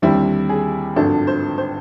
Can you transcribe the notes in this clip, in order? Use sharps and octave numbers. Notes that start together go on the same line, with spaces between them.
D#2 D3 G3 C4 E4
G#4
G#1 G2 D3 F3 A4
C5
C5